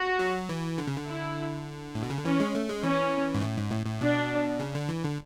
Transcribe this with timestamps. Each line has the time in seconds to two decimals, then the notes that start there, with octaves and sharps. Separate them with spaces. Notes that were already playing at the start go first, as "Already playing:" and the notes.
Already playing: F#4
0.19 F#3
0.49 E3
0.78 D3
0.87 C#3
0.97 D3
1.07 E4
1.95 A2
2.03 B2
2.10 C#3
2.17 D3
2.25 E3 C#4
2.40 G#3
2.55 A3
2.68 G#3
2.83 E3 C#4
3.34 G#2
3.42 A2
3.57 G#2
3.72 A2
3.86 A2
4.01 B2 D4
4.59 C#3
4.75 D3
4.89 E3
5.03 D3